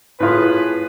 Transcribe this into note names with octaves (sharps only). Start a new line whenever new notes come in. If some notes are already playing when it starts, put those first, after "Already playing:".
A2 F4 G#4 B4